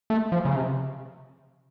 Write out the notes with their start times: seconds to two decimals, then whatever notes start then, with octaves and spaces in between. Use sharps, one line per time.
0.10 A3
0.32 F3
0.45 C#3
0.56 C3